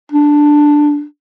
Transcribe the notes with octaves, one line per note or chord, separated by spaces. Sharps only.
D4